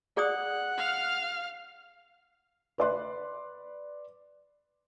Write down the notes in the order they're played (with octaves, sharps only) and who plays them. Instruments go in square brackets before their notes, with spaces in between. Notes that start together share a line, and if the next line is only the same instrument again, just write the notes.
[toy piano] G#4 D5 D#6 [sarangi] F#5
[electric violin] F5 F6
[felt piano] B4 D5 C6 F#6